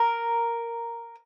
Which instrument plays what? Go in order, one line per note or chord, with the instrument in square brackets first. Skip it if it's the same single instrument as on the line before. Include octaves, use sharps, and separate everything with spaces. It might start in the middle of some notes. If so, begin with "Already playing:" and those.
Already playing: [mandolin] A#4